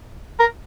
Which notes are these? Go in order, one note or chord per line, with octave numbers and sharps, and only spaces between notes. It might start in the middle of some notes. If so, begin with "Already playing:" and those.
A#4